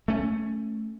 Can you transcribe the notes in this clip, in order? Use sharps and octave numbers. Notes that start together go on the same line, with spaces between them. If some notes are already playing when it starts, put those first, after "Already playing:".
A3 C#4